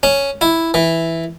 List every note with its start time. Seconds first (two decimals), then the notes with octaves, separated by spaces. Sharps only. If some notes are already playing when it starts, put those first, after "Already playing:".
0.03 C#4
0.41 E4
0.74 E3